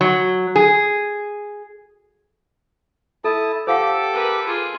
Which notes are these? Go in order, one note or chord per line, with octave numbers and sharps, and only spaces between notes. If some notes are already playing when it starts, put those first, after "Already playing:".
F#3
G#4
E4 A4 A5 D#6
G4 A4 C5 F5 F#5 D6
A#4 B4
F4 G#4